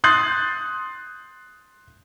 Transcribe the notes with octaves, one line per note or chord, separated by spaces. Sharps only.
C6 D#6 F#6 G6 A6 C7